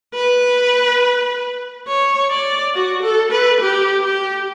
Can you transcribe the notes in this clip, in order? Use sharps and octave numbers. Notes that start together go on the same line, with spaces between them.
B4
C#5
D5
F#4
A4
B4
G4
G4